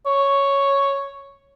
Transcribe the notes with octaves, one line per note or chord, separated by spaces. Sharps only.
C#5